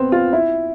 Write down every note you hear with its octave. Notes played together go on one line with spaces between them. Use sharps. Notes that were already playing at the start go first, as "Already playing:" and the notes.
Already playing: B3 C4
F4
E4